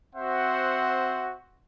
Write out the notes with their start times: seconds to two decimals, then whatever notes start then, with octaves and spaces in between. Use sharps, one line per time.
0.16 C4 F#4 C5 E5 F#5